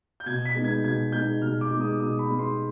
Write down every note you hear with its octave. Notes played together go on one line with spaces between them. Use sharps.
G6
B2 G#6
B6
G#3 B3 D#4
G#6
B2 G#6
G#3 B3 D#4 G6
B2 F6
D6
G#3 B3 D#4
D#6
B2 D#6
B5
G#3 B3 D#4
C6